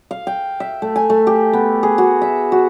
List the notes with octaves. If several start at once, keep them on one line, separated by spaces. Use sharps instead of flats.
F5
G5
E5
A3
G#5
A3
G4
B3
G#4
F#4
E5
F#4